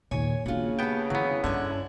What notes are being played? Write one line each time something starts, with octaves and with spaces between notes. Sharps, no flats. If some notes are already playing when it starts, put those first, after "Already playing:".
D#2 A#2 C#5 G#5
C#3 A#3 D4 F4 F#4
B3 G4 G5 A5
D3 E3 F#3 B3
G2 D3 C#4 E4 C#5